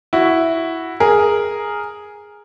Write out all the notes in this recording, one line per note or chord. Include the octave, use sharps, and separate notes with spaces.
E4 F#4
G#4 A#4